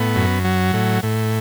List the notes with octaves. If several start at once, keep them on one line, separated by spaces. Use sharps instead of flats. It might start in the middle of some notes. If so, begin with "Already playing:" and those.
Already playing: A2 B3
F#2
F#3
A2
A2